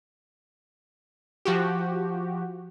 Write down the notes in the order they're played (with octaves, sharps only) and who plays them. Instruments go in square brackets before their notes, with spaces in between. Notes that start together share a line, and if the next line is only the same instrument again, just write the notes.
[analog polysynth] F3 F#4 G4